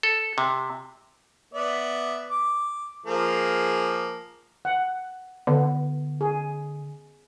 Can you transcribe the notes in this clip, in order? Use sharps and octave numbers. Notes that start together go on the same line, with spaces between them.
A4
C3
B3 D5 E5
D6
F3 A#3 G#4
F#5
D3 B3
G#4